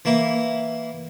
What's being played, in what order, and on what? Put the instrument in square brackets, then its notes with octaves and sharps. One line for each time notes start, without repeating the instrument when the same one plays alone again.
[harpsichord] E3 A#3 E4